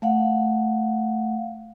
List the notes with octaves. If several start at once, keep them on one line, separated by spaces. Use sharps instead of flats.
A3 F5 F#5